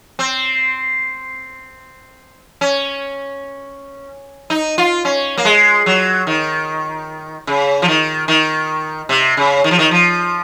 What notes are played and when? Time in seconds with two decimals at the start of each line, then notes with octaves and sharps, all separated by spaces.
0.19 C4
2.61 C#4
4.50 D#4
4.78 F4
5.05 C#4
5.38 A#3
5.45 G#3
5.86 F#3
6.27 D#3
7.47 C#3
7.82 F3
7.88 D#3
8.28 D#3
9.09 C3
9.37 C#3
9.64 D#3
9.71 F3
9.79 D#3
9.91 F3